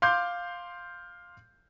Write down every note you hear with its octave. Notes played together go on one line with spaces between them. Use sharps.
F5 C6 D6 G6